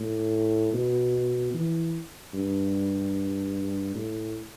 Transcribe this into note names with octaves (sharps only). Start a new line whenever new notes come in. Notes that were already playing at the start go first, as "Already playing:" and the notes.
Already playing: A2
B2
E3
G2
A2